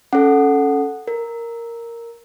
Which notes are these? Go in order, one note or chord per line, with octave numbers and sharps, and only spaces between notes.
C#4 A4 F#5
A#4